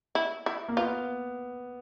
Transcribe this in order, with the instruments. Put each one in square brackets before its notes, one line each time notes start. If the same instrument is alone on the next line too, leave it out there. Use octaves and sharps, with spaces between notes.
[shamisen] E4
E4
[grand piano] A#3
[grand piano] B3 [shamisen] F4